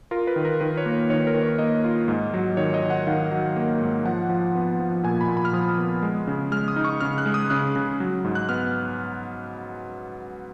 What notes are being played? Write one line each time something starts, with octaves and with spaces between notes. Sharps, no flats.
F4 A#4
B4
D#3
A#4
D#3 B4
C#5
A#3
D#3 C#5
A#4
D#3
C#5
A#3 D#5
F4
G#2
F#3
D#3 C#5
D#5
D#3
F#5
D#3 F5
F#3
A#3
G#2
F3 F#5
F3
B3
F3
A#2 G#5
B5
A#2
B5
F6
F3 D#6
B3
G#3
C#3
G#3 F6
D#6
D#4
C#6
C#3 F6
F#6
G#3
D#6
C#3 F#6
C#3
F#3
G#2
F#6
B3 F6